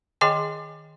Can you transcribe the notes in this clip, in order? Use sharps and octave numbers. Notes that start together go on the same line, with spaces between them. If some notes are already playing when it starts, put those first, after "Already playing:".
D#3 G#4 D#5 G5 G#5 C6